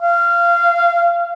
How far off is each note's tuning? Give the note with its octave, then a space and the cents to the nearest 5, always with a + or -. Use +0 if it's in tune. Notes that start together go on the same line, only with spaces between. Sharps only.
F5 -20